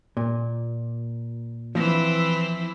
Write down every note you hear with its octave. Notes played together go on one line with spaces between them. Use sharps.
A#2
E3 F3 C4 E4